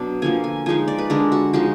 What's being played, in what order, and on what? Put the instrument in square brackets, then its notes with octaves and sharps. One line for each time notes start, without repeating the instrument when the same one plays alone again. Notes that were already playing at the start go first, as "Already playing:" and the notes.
Already playing: [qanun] B2 F#3 D4
D3 F3 A#3 G#5
G#5
F3 G#3 D#4 G#5
D5
B4
D3 G#3 D4 A#4
F#4
F3 G#3 D#4 F#4